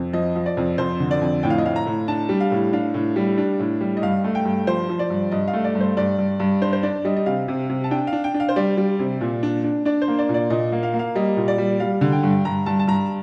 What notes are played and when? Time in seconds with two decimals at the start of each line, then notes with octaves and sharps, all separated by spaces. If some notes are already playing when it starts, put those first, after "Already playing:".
Already playing: F2
0.13 F3 D#5
0.35 F3
0.46 D5
0.57 F2
0.78 F2 C5
1.00 D3
1.11 D5
1.21 F2
1.43 A2 G5
1.50 F5
1.58 D#5
1.64 A2 F5
1.76 A#5
1.86 A2
2.08 D4 A5
2.29 G3
2.40 F5
2.51 A2
2.73 D4 F5
2.94 A2
3.16 G3
3.38 D4
3.60 A2
3.81 G3
3.97 D#5
4.02 G2 F5
4.24 A3
4.35 G5
4.45 G2
4.67 F3 C5
4.89 F3
4.99 D5
5.10 G2
5.31 G2 D#5
5.48 F5
5.53 A3
5.64 D5
5.75 G2
5.81 C5
5.97 G2 D5
6.18 G2
6.40 G2
6.61 D4 C5
6.73 C5
6.83 D4 D5
7.05 G3 D#5
7.16 D#5
7.26 C3 F5
7.48 C3
7.70 C3
7.84 A5
7.91 D4 G5
8.07 F5
8.13 D4
8.24 G5
8.34 D4
8.40 F5
8.49 C5
8.56 G3 D5
8.77 G3
8.99 C3
9.21 A#2
9.43 D4
9.64 D4
9.85 D4 D5
10.02 C5
10.08 A#3
10.19 D5
10.29 A#2
10.34 D5
10.50 A#2 D#5
10.72 A#3
10.83 F5
10.94 A#3
10.99 F5
11.15 G3 D#5
11.37 A#2
11.48 D5
11.58 G3
11.80 G3 F5
12.01 D3
12.12 G5
12.23 G2
12.45 G2 A#5
12.66 G2 A5
12.79 A5
12.88 G2 A#5